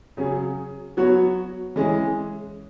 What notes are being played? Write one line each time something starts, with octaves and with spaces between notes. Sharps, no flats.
C#3 F#3 C#4 G#4
F#3 B3 F#4 C#5
E3 G#3 C#4 G#4